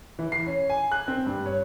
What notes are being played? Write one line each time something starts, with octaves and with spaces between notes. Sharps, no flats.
E3
C7
C#4
G#5
F#6
C4
G2
C#5